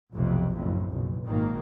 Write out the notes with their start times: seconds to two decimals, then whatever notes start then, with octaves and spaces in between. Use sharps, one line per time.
0.12 F1 B1 F2 C3
0.56 F#1 F2 A2
0.89 F#1 B1
1.24 G#1 A#2 D#3 A#3